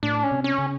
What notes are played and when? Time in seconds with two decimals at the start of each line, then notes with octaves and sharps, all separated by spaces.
0.03 A2 D4
0.23 C#4
0.31 C3
0.44 C#4
0.58 C#3